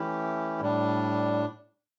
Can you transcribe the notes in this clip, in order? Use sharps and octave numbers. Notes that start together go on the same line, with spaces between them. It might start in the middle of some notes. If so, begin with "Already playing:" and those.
Already playing: E3 A3 C#4 E4 G4
A2 G3 D4